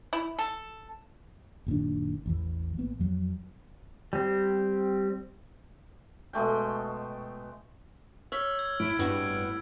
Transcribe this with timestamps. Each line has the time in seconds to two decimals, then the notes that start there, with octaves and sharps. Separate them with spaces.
0.13 E4
0.39 A4
1.66 F#1 A#2 D#3 D4
2.26 A1 E2 E3
2.77 A1 A#3 B3
2.99 F2 F#3
4.13 G3 C4
6.33 B2 G#3 A3 G5
8.32 C#5 E6 F6 B6
8.59 G#6
8.80 A2 E4 D7
8.99 G2 B3 C4 F#4